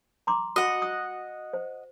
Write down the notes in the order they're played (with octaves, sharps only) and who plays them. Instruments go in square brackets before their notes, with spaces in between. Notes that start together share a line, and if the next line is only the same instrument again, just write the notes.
[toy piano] A#5 C6 D6
[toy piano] F#4 D#6 [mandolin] D#5 F#5
[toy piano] D#6
C5